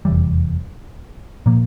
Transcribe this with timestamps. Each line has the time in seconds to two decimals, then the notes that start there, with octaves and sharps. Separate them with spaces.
0.05 F1 E2 E3 G3
1.46 A#2 F3 A#3